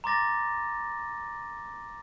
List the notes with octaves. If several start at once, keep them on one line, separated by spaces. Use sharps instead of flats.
A#5 C6 D6 A6 A#6